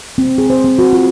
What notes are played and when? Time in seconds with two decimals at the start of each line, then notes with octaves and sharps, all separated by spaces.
0.18 C4
0.38 G#4
0.50 C5
0.64 C4
0.79 F#4
0.93 F4